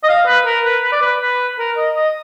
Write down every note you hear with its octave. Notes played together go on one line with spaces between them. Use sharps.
D#5
F5
B4
A#4
B4
B4
D5
B4
B4
A#4
D#5
D#5